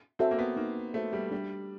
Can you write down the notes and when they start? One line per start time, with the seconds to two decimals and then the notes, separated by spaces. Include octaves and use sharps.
0.19 C4 F#4 A4 C5 E5
0.31 A#3
0.39 B3
0.57 A#3 D#4
0.94 A3 F#4 A4 C5 E5
1.13 G3
1.31 G3 D4